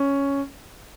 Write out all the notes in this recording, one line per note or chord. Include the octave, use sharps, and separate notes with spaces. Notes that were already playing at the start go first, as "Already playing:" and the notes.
Already playing: C#4